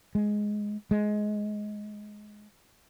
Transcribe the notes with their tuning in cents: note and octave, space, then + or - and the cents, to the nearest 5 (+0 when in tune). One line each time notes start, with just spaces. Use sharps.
G#3 +5
G#3 +15